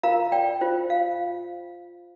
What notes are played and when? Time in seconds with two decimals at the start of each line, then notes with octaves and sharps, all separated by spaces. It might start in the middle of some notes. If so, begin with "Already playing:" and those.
0.03 F4 A#4 F5 A#5
0.32 D5 G5
0.61 F4 C5
0.90 F5